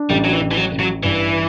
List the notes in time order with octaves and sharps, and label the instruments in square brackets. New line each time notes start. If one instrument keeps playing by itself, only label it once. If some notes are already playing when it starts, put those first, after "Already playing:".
Already playing: [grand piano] D4
[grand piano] A1 [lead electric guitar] G3
[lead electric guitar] F#3
E3
[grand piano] A1
[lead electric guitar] E3
F#3
[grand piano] A1
[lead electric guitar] F#3
[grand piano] G2 [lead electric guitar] E3